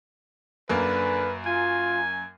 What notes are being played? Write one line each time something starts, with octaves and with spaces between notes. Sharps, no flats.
F#2 D3 A#3 B4
F4 G#5